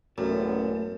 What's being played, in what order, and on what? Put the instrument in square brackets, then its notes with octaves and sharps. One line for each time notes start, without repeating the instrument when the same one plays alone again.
[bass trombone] A1 [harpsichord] F#2 [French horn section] A#2 G#3 B3 [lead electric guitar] A3